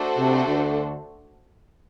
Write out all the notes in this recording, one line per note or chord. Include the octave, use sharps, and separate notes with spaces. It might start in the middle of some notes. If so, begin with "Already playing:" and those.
Already playing: A3 D4 F#4 A4 C5
C3
D2 D3